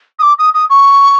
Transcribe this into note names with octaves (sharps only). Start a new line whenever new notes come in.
D#6
D6
D#6
D#6
C#6